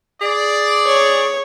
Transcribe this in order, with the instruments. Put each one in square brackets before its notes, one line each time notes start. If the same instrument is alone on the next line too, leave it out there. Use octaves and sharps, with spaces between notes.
[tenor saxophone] G#4 [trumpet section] D5
[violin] C#5